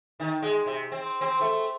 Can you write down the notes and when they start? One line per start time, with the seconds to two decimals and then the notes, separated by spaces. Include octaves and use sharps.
0.20 D#3
0.42 G#3
0.66 C3
0.92 C4
1.21 C4
1.40 A3